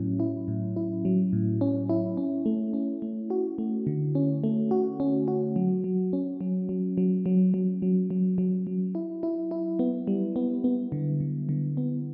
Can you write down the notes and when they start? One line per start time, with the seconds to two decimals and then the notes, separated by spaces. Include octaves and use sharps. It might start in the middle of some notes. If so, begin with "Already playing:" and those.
Already playing: A2 F#3 C#4 E4
0.20 E4
0.48 A2
0.76 E4
1.05 F#3
1.33 A2
1.61 C#4
1.90 E4
2.17 C#4
2.46 A3
2.74 C#4
3.02 A3
3.30 F#4
3.58 A3
3.87 D3
4.15 C#4
4.44 A3
4.71 F#4
5.00 C#4
5.28 F#4
5.56 F#3
5.84 F#3
6.13 C#4
6.41 F#3
6.69 F#3
6.98 F#3
7.26 F#3
7.54 F#3
7.82 F#3
8.10 F#3
8.38 F#3
8.67 F#3
8.95 E4
9.23 E4
9.51 E4
9.79 B3
10.07 G3
10.36 B3
10.64 B3
10.92 D3
11.20 D3
11.49 D3
11.77 B3